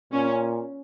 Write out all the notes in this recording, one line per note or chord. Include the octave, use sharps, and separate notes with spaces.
A#2 C#4